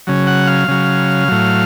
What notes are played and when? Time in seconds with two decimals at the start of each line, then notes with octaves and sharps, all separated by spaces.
0.07 C#3 F#3
0.27 F#5
0.47 F5
0.68 C#3 F#3
1.28 A2 F#3